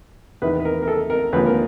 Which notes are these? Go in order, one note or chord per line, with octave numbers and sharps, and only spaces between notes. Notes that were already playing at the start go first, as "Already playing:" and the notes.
E2 C3 D#3 B4
B4
A#4
A#4
A4
A#4
D#2 D3 F3 G#3 B4
A#4